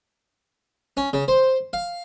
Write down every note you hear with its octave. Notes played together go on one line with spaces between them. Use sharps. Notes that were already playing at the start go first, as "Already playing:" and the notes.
C#4
C#3
C5
F5